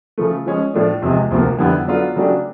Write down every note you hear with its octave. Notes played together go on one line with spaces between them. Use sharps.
C#3 F3 A3
F3 G#3 C#4
A2 F3 A3 D4
E2 C3 F3 G#3
D2 C3 F3 A#3
F2 D3 G3 B3 E4
F#3 B3 D4 F4 A4
C#3 F#3 A3 D4 G4